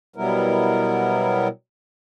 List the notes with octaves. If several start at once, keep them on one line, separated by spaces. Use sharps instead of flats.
B2 F#3 G3 B3 E4 A#4